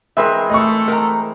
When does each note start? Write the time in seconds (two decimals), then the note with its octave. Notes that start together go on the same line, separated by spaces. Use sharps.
0.17 E3 G#3 C4 A#4 B4 E5
0.50 A3 D#5 C#6
0.88 A#4 A#5